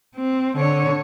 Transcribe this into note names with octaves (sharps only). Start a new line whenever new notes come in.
C4
D3 C#5